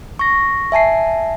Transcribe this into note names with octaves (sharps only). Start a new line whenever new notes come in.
C#6 A#6
E5 G#5 A5 C7